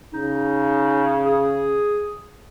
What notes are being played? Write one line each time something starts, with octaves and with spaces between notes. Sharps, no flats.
C#3 D#4
G#4